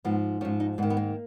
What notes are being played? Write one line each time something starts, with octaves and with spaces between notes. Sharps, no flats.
G#2 F3 B3
G#2 F3 C#4
D#4
G#2 D#3 B3
B3
A#3